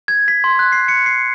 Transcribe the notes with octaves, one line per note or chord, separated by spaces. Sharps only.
G#6
B6
C6
F#6
C7
C#7
C7